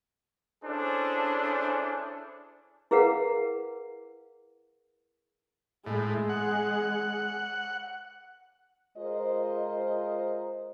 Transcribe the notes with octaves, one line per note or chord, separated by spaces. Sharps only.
C#4 D4 E4 G#4 A4 C5
E4 G#4 A#4 B4 F5 F#5
A2 G#3
F#5
G#3 F4 A#4 C5 D#5